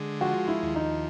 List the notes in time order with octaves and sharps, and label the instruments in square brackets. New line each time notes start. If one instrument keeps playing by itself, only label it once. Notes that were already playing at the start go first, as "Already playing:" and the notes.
Already playing: [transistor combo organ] D3 G#3
[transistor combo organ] F3 [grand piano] F#4
[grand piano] E4
[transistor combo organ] D#2
[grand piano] D#4